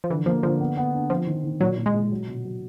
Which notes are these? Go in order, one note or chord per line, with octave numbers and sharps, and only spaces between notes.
F3
D3 E3
F3 A#3
D3 F3
B3
B3
D4
F3 C4
D#3
D#3
A#2 F#3
A#2
G#3
A#2
F#3
B2
F#3